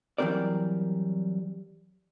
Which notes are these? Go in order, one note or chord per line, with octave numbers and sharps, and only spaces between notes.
E3 F#3 G3 C4 A#4 D5